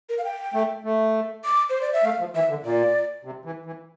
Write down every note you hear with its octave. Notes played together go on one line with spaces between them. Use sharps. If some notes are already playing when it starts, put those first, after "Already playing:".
A#4
F5
G5
A3
A3
D6
C5
D5
E5
A3 F5
F3
E3 E5
D3
A#2 D5
C3
E3
E3